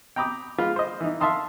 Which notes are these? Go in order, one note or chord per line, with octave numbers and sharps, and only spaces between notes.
G5 A#5 B5 D6 D#6
G#3 F4 B4
C5 D#5
E3 D#4
E5 F5 A5 C6 D#6